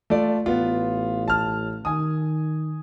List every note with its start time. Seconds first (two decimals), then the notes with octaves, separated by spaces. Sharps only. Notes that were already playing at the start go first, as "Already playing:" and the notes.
0.10 A3 F4 D5
0.46 A1 B3 F4
1.28 A5 F6
1.85 D#3 G#5 D#6